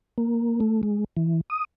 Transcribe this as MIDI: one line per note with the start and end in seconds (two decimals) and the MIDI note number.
0.18 0.60 58
0.60 0.81 57
0.83 1.04 56
1.17 1.41 52
1.50 1.65 87